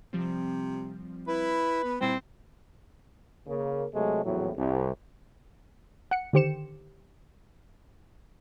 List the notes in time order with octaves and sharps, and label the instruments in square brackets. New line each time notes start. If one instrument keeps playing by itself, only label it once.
[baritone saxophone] C3 [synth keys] F3 G3 C4
[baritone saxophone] E4 [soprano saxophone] B4
[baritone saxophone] B3
[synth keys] A#2 G3 [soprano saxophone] C4 [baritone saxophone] E4
[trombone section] C#3 A#3
C3 F#3 G#3 A3
A#1 E2 A2 F#3
C2
[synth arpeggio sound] F#5 C#7
D3 D#3 G4 C5 C#7 E7